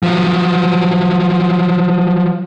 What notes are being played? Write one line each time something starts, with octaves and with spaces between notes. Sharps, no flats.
F3 F#3